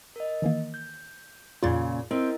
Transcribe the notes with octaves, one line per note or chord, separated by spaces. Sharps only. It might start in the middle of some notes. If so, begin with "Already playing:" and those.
A#4 D#5
D#3 E3 A#3
G6
F2 A#2 C#3 F4
C4 E4 A#4 D#5